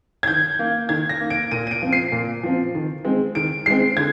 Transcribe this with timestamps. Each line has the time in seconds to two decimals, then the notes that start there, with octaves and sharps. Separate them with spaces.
0.23 G#6
0.28 D#3 G6
0.59 A#3
0.89 D#3 G#6
1.09 A#6
1.20 A#3
1.30 D7
1.51 A#2 D#7
1.67 D#7
1.71 D7
1.82 F3 C4
1.93 C7
2.12 A#2
2.43 F3 C4
2.75 D#3
3.05 G#3 C4
3.35 D#3 D7
3.66 G#3 C4 C7
3.97 D3 G#6